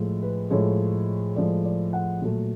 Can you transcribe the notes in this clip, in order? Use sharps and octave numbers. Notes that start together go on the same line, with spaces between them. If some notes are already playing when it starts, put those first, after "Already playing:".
Already playing: A2 F3 G#3
B4
A2 F3 G#3 C#5
A2 F3 G#3 D5
D5
F#5
A#2 F#3 A3